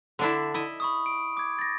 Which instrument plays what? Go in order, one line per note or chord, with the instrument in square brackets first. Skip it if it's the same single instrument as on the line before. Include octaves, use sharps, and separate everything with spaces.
[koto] D3 D4 E4
E4 D#5
[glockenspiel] B5 C#6 D#6
D7
D6 G#6
A6 A#6